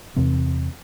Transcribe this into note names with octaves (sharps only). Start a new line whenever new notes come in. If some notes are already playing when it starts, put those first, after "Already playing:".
E2 C3 C4